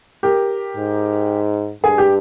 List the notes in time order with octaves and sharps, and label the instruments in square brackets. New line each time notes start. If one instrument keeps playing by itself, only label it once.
[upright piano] G4 A#4
[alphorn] G#2
[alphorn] G2 [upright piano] G#4
[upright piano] G4